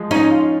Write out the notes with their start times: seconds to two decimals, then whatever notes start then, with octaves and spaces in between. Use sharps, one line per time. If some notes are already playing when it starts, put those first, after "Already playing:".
Already playing: F3 G#3
0.11 C#4 D#4
0.30 F4